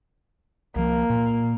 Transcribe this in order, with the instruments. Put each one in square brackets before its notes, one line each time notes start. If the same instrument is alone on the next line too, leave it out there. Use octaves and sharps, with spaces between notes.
[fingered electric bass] C2 F3 [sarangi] A#3
[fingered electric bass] A#2